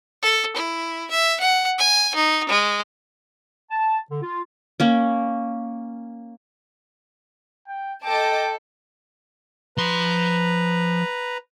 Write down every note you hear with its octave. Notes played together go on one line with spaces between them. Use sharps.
A4
E4
E5
F#5
G#5
D#4
G#3
A5
D3
F4
A#3 C#4
G5
A4 D#5 G5 A5 D6
F3 B4 A#5 C6